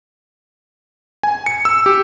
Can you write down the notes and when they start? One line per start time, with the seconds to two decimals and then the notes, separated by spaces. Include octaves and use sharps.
1.23 G#5
1.46 C#7
1.65 E6
1.86 G4